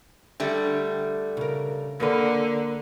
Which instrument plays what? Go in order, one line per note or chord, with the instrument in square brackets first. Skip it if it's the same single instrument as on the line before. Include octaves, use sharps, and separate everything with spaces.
[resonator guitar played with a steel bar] D3 G3 A3
[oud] C#3 A#4
[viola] D3 [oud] A#3 A#4 B4